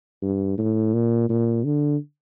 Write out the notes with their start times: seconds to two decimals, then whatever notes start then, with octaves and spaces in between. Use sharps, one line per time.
0.22 G2
0.58 A2
0.93 A#2
1.29 A#2
1.64 D3